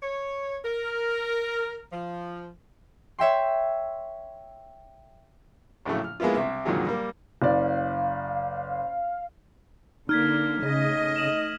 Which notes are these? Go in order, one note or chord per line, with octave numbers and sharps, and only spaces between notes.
C#5
A#4
F3
C#5 E5 G5 C6
A#1 A2 C#3 F#3 A3
F6
G#3 A#3 B3 E4 F4
C2 C3 E5
F2 A#2 D3 D#3 F#3 G#3
G3 A#3
F#1 D5 F5
D3 A#3 D#4 F6 G#6 B6
C#3 A3 D#5
E7 F#7